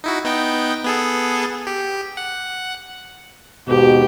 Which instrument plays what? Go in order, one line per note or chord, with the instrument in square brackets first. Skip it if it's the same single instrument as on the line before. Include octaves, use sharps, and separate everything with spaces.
[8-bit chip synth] D#4 E4 F#4
B3 D#4 G5
B3 G#4 A4
G4
F#5
[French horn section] D#2 G#2 B2 [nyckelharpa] G4